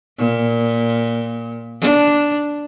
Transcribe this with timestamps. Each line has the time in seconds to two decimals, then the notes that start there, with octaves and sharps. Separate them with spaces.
0.18 A#2
1.81 D4